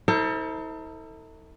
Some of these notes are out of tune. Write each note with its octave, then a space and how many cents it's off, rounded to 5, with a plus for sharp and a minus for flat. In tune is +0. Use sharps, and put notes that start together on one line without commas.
E4 -45 A4 +35 C5 +0